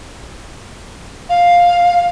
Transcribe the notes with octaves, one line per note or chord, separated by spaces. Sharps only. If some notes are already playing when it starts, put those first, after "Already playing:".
F5